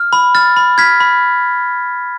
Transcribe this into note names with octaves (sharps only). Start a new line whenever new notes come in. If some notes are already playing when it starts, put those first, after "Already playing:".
Already playing: F6
B5
F6 A6
B5
F6 G#6 B6
B5